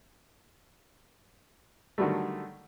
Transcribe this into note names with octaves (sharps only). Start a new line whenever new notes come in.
D3 D#3 F#3 G3 A3